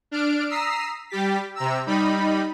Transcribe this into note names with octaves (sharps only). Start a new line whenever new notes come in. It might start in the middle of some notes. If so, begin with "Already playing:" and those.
D4 F6 D7
A#5 D#6 E6 B6 C7
G3 G4 A6 B6
C3 A#5 E6
G3 D#4 B5